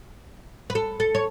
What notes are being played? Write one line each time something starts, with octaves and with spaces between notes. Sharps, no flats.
B4
A4
A4
C#5